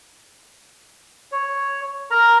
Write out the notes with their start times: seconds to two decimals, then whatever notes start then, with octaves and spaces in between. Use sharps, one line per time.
1.32 C#5
2.11 A#4 A#5